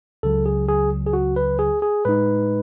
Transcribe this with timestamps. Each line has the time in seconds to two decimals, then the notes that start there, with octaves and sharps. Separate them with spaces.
0.23 C#2 C#3 F#3 A4
0.46 G#4
0.68 G#4
1.07 G#4
1.13 F#4
1.36 B4
1.59 G#4
1.82 G#4
2.05 A2 G#3 D#4 B4